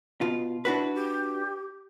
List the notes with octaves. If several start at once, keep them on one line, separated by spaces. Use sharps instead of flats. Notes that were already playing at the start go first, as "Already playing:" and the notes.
B2 F4
D4 E4 F#4 B4
G4